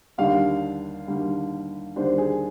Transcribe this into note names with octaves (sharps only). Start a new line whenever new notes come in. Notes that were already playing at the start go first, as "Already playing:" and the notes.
D#2 D3 G3 D4 F5
D#2 D3 G3 D4
D#2 D3 G3 D4 C5
G#4